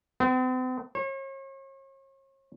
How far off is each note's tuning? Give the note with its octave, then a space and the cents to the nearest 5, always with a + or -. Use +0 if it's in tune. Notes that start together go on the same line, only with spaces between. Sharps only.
C4 -45
C#5 -40